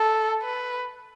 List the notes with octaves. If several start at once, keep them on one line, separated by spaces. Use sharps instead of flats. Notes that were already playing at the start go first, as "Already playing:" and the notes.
Already playing: A4
B4